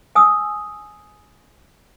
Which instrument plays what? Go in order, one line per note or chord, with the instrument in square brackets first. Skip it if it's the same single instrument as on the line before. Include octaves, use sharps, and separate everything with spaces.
[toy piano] G#5 D#6 E6